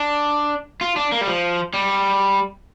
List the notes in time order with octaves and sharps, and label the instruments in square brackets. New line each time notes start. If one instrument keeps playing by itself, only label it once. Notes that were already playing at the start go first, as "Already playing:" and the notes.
Already playing: [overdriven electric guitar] D4
F4
D4
A#3
G3
F3
G3